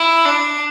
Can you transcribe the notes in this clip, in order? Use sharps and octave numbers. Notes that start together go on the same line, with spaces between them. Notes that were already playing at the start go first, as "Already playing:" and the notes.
Already playing: E4
D4